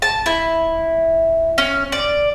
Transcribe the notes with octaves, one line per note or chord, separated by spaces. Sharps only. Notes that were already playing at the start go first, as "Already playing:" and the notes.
A5
E4
C#4
D5